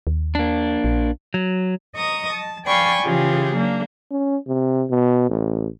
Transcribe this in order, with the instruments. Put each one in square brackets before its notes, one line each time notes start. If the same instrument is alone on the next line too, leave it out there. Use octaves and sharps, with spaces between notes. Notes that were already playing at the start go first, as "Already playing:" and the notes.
[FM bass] D#2
[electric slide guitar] A#3 D4
[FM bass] A#1
[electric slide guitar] F#3
[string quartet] D#5 A#5 C#6 D#6
A5
D5 F5 G5 G#5 B5 C#6
C#3 E3 F4 G4 G#4
F#3 A#3 D4
[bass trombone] C#4
C3
B2
A1